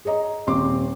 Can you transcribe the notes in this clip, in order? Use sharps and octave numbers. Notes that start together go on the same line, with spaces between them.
G#4 C#5 D#5 A#5
D#1 C4 C6 D6